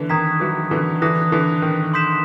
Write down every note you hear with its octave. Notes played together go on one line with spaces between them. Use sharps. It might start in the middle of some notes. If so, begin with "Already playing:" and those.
Already playing: D3 E3
D#3 A#5 D#6 G#6 B6
E3 F#3
D3 E3
D3 E3 D#6 F#6 A#6
D3 E3
D#3
C6 D#6 G6 B6 E7